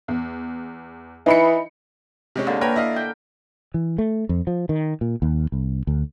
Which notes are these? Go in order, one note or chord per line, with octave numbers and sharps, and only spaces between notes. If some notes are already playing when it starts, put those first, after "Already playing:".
E2
E3 D#4 B5 C#7
C3 G#3 C#4
D3 A#3
A#4 B4 C#5 G5
E4 D#5 F5
G5
E3
A3
F2
F3
D#3
A#2
D#2
C2
D2